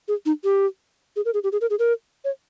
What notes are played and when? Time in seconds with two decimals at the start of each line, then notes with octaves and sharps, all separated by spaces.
0.08 G#4
0.26 D#4
0.44 G4
1.16 G#4
1.25 A#4
1.34 G#4
1.44 G4
1.52 G#4
1.61 A#4
1.70 G#4
1.79 A#4
2.25 C#5